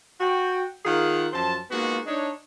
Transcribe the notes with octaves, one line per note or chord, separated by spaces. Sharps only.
F#4 G5
D#3 F4 G#4 A#4 F5 F#5
F#2 F3 C5 A5
G#3 A#3 B3 D#4 F4 F#4
D4 D#4 C#5